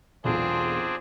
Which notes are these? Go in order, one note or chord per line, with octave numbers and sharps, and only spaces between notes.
E1 B1 C4 D4 F4 G#4